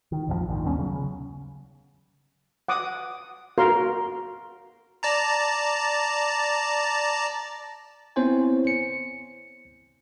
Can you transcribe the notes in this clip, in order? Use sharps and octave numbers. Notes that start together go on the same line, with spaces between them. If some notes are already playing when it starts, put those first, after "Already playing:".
D#3
A#1 F2 C#3 F3
A#1 G#2 D#3
D#2 G3 B3 C#4
C#3 F#3
F#5 D6 D#6
F#4 A#4 F5 C6
D5 A5 A#5
B3 C4 E4 C5 C#5 G#5
C#7